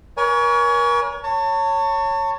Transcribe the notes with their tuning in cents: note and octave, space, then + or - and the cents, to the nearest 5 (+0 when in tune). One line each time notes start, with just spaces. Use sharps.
A#4 +40 C#5 +30 G#5 +0
C#5 +0 A5 +35